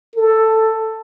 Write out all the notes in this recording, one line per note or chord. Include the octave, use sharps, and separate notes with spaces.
A4